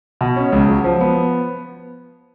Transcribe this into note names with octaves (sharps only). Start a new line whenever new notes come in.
B2
C#4
C#2
F#3
F3
B3